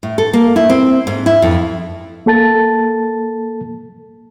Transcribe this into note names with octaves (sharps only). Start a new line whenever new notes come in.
A2
A4
A#3
E4
C4
G#2
E4
F2
A#3 A4 A5 A6